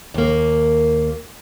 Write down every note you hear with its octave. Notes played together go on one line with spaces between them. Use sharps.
D#2 A#3